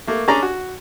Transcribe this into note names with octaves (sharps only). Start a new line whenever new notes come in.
A3 A#3
C#4 D4 G#4 D5 A#5
F#4